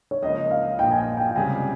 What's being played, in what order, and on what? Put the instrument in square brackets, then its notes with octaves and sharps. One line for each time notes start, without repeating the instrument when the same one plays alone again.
[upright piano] C#5
[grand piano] C#2 C#3 F3 A#3 [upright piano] D#5
[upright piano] F5
[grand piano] A#1 A#2 F3 [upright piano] G5
[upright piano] G#5
G5
G5
G5
[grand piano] C#2 C3 G3 C#4 G#4 [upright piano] G#5